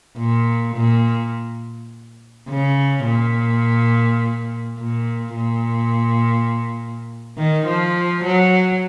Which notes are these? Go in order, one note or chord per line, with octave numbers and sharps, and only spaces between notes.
A#2
A#2
C#3
A#2
A#2
A#2
D#3
F3
F#3